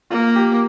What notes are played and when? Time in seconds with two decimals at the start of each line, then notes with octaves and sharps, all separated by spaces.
0.10 A#3 F4
0.36 G4